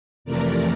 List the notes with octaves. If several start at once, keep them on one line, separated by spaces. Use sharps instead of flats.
F2 C3 E3 A3 A#4 D5